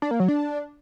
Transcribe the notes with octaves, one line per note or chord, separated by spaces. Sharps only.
D4
A#3
F#3
D4